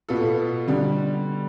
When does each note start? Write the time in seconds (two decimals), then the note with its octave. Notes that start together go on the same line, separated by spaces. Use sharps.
0.09 B2 B3 F4 A4
0.68 D3 G3